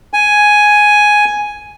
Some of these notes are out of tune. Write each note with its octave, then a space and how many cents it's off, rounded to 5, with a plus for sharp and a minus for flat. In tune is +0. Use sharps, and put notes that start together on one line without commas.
G#5 +5